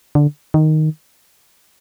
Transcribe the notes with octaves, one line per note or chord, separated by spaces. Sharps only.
D3
D#3